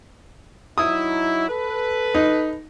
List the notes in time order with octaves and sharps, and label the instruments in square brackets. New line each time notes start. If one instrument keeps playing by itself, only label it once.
[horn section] F#3 D#4 E4 [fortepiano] D#6
[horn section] A4 B4
[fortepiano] D#4